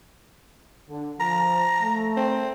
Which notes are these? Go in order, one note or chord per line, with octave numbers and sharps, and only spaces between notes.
D3
F3 A#5
A3
C4